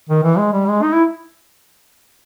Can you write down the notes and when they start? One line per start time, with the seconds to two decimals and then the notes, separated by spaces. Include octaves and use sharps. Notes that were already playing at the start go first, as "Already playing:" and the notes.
0.09 D#3
0.23 E3
0.38 G#3
0.52 G3
0.68 G#3
0.82 D#4
0.93 E4